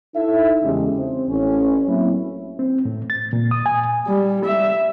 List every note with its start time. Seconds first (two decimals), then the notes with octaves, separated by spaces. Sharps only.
0.15 D#4 E4 A4 E5
0.63 E2 C#3 G3 G#3
0.98 C4 C5
1.29 A1 C#4
1.87 F#3 A3 A#3 C4 E4
2.59 C4
2.85 A2
3.10 A6
3.33 A#2
3.51 D#6
3.66 G#5
4.07 G3
4.45 E5